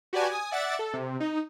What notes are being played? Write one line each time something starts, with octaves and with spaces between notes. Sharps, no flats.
F#4 G4 B4 D5 G#5 A5
G#5 D#6
D5 E5 F#5 A6
A4
C3
D#4